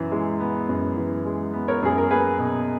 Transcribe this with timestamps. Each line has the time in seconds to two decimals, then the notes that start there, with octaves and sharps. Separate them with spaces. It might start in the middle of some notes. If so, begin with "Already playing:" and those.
Already playing: F#2 E3 E5
0.12 G#3
0.40 B3
0.69 F#2
0.97 E3
1.26 G#3
1.53 B3
1.68 A#4 C#5
1.82 F#2 G#4
1.98 A#4
2.11 A#3 G#4 B4
2.38 B2